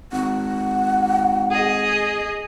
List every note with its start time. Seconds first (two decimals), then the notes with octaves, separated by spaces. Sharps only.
0.12 G#1 F#5
1.50 G#4 D#5